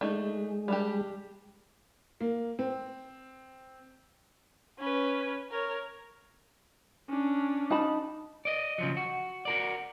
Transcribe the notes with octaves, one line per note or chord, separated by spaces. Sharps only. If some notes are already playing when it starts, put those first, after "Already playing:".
G#3 A3 D4 D#4
G3 D4 G4
A#3
C4
C#4 B4
A#4 C#5
C#4 D4
D#4 A5 B5
D5 D#5
C#3 F3 F#3
F#4
F#4 A#4 D5